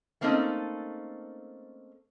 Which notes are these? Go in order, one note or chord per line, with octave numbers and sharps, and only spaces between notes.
A3 A#3 C4 C#4 D#4 A4